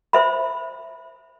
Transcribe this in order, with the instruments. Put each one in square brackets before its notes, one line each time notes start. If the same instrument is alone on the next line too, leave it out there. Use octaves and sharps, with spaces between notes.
[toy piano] C5 E5 B5